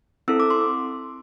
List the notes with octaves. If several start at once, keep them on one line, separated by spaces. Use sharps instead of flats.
C4 E4 A4 E6
D6
C6